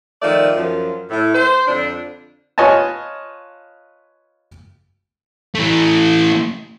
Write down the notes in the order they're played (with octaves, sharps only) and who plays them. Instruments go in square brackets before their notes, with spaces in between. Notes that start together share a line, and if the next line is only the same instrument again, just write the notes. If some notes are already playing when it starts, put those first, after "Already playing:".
[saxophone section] D#3 F3 A3 D5
F#2 F3
A2
C5
F2 D3 D4
[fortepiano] F4 B4 C#5 D#5 G#5 A5
[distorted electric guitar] E3 A3